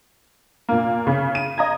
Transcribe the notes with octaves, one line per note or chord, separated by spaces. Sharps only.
A#2 A#3
C#3
D#7
D#5 A#5 G#6